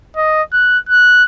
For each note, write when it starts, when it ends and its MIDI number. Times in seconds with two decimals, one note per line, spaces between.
0.17 0.42 75
0.53 0.78 90
0.89 1.24 90